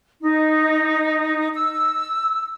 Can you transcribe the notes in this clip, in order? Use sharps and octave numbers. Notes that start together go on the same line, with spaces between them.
D#4
E6